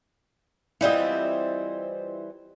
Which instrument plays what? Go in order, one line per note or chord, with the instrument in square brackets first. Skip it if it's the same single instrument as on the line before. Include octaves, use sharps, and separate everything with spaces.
[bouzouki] E3 G3 C4 [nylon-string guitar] E4 F4 D#5